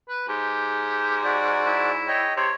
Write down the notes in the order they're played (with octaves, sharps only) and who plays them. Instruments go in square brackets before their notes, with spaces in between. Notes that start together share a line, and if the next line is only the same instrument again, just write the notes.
[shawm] B4
[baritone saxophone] G#2 [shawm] G4
[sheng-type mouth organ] F#4 D5
[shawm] E4
[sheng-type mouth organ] C#5 D#5 G5
[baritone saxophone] C3 [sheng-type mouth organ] C#5